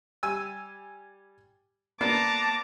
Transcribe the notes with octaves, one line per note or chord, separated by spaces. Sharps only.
G3 G#5 E6
A#3 B3 D4 A5 A#5 D6